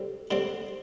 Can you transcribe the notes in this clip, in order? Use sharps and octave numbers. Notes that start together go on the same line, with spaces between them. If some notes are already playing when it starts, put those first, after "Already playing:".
Already playing: D3 G3 C4
D3 G3 C4